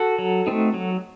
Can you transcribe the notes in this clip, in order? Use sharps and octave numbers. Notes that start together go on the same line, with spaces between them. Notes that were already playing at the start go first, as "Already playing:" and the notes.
Already playing: F#4 A4
F#3
A3 C4 D#4
F#3